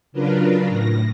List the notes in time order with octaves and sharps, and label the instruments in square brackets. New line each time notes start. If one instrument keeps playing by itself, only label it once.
[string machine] C#3 F#3 D4 F4 A#4 B4
A2 A#6